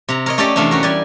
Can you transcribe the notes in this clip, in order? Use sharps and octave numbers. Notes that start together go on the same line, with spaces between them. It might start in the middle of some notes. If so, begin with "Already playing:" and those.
C3 A#5
A#4 C#5 D#5
A3 C#4 G4 A4 D5 D#5
E2 C3 A3 D4 F5
C#4 F#4 A#4
G3 D5 G#5